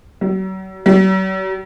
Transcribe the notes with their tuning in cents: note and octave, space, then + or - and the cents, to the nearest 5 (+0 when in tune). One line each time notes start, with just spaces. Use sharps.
F#3 +40
F#3 +45